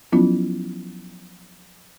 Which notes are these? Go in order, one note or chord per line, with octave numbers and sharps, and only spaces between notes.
F3 F#3 B3 C#4 E4 F4